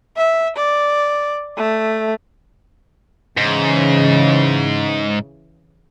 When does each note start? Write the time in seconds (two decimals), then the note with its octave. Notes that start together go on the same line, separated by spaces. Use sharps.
0.17 E5
0.57 D5
1.57 A3
3.37 G#2 C#3 E3